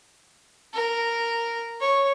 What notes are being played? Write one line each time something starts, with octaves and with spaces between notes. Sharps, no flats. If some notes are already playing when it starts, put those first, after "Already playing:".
A#4
C#5